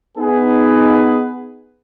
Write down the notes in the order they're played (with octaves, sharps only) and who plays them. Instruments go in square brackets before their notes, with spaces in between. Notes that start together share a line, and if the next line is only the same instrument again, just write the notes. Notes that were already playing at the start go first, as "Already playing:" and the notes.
[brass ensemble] B3 D#4 G#4 B4